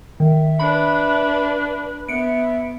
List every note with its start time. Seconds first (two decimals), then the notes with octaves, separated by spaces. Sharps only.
0.20 D#3 E5
0.59 D4 B4 B5
2.08 B3 E5 C#7 D7